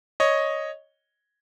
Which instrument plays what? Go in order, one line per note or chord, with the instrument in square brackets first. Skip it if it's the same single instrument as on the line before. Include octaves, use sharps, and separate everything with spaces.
[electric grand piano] C#5 D#5